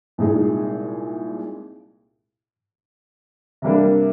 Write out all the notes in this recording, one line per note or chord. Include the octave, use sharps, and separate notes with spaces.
C2 A#2 G#3 D#4 G#4
C3 G3 A#3 D4